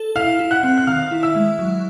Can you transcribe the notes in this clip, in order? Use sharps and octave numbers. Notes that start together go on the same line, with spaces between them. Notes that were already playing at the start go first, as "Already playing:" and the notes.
Already playing: A4
E4 F5 F6
E4
F#5 F#6
C4
F#6
D#3 F5 F6
E4
E5 E6
G#3
F#3